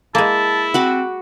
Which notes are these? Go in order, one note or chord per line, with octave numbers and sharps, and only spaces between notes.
G#3 A#3 E4 A5
C4 F#4 B5 D6